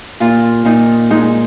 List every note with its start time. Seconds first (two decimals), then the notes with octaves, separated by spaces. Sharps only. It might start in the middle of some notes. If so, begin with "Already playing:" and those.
0.20 A#2 F4
0.65 A#2 D#4
1.10 G#3 D#4